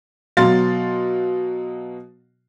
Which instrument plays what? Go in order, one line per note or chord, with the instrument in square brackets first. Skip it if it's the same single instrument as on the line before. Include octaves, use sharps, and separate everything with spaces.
[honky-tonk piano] B2 F#3 F5 C6 A6